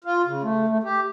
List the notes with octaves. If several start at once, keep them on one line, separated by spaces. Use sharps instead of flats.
F4
C#3
A3
A3
G4